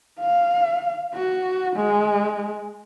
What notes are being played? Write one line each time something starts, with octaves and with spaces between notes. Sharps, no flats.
F5
F#4
G#3